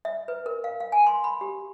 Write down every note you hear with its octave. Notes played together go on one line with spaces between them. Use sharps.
E5
B4
A#4
F5
F5
G#5
C6
B5
G4